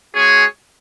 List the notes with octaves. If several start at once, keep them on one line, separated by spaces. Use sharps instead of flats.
G#3 C#4 F#4 G#4 C#5